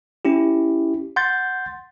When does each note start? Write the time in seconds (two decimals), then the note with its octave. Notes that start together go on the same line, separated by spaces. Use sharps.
0.25 C#4 E4 G4
1.16 F#5 C6 G6 A6